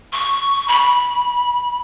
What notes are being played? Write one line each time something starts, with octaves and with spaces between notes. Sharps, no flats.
C#6
B5